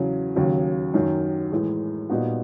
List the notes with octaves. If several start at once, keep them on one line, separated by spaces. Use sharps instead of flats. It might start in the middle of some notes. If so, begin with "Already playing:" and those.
Already playing: E2 C#3 F#3
D#2 C#3 F#3
F#2 D#3 F#3
A2 E3 G#3
A#2 G3 B3 D#4 F#4